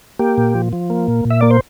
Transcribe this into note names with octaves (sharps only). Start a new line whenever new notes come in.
A#3 G4
A#2
F3
F3
A#3
A#2
A#2
E5
A#3 D5
C5